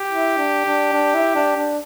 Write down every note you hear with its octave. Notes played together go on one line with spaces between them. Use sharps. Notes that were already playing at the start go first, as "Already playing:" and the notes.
Already playing: G4
E4
D4
D4
D4
E4
D4
D4